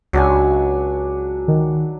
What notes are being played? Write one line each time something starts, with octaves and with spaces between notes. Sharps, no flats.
C#2 F#3 D4 G#5
D#3